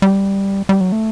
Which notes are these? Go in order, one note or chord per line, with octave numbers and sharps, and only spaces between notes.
G3
G3
F#3
A3